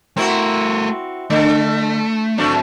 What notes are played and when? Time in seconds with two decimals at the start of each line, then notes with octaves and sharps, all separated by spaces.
0.17 A3 C4 E4 F#4 A#4
1.30 D3 A3
2.38 F#3 A3 C4 D4